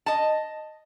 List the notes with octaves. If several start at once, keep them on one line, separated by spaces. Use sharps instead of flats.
D#5 A5